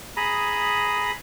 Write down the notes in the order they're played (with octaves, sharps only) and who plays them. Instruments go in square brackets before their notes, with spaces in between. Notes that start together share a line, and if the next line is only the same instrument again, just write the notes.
[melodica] G#4 A#5 B5 D#6